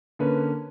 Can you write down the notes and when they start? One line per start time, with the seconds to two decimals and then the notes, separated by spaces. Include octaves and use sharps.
0.19 D3 A#3 C#4 B4